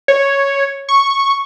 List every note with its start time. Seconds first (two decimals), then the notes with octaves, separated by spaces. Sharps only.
0.08 C#5
0.89 C#6